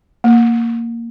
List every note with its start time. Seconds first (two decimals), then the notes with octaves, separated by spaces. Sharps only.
0.24 A#3